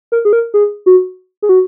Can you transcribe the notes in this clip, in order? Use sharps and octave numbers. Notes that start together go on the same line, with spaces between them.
A#4
G#4
A#4
G#4
F#4
G#4
F#4